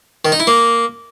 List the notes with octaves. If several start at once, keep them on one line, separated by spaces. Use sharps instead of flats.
D#3
D#4
E4
A#3